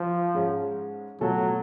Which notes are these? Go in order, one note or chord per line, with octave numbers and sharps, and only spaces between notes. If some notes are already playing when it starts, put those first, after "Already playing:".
Already playing: F3
G#2 G#3 C#4
B2 F#3 A3 F4 A4